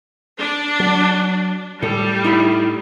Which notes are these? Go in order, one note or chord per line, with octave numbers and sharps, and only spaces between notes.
D4
F#3
A2 G3 A4
D#4 E4 B5